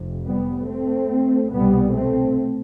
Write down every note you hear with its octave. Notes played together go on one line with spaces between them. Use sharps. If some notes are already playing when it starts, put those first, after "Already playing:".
Already playing: F1 F2 C3
G3 B3
A3 C4
C2 B2 G3 B3
A3 C4